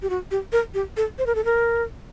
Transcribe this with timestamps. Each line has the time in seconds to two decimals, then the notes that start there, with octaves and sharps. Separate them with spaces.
0.02 G4
0.10 F#4
0.31 G4
0.52 A#4
0.74 G4
0.97 A4
1.19 C5
1.26 A#4
1.35 A4
1.45 A#4